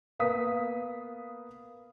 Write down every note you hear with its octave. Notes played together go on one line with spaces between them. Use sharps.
A#3 B3 F5 D#6 B6